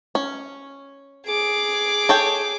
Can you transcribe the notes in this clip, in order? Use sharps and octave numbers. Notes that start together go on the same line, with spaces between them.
C#4
G#4 D6
A4 C#5 G5